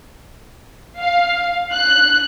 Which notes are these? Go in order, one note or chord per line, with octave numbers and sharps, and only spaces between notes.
F5
F#6